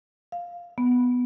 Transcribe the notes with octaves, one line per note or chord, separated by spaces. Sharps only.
F5
B3